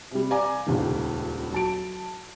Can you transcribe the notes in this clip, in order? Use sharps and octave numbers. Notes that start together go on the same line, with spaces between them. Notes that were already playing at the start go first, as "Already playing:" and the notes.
C3 G3
D5 F5 G#5 A#5 D6
D#1 C#2 G2 D#3
F#3 A5 D7